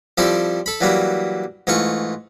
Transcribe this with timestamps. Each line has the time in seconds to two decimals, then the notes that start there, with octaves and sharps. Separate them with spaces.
0.18 F3 G3 C4 E4 A4 C5
0.66 A4 B5
0.81 E3 F#3 G3 A#3 E4
1.67 G#2 E3 A3 F4 C#6